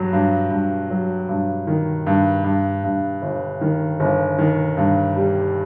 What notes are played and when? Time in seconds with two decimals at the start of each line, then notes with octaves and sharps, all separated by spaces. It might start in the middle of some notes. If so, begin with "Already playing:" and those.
Already playing: G2 F#3
0.13 G2
0.51 G2
0.90 F#3
1.29 G2
1.67 D#3
2.07 G2
2.44 G2
2.84 G2
3.22 G1
3.61 D#3
4.00 G1
4.38 D#3
4.77 G2
5.16 G3